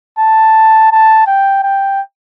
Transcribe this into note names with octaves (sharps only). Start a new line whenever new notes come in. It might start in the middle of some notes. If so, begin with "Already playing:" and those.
A5
A5
G5
G5